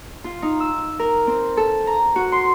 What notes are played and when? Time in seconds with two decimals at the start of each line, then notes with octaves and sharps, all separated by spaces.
0.24 F4
0.42 D#4
0.60 E6
0.99 A#4
1.27 C4
1.57 A4
1.87 A#5
2.16 F#4
2.32 C6